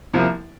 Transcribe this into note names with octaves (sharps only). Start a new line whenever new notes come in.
C2 C3 F3 A#3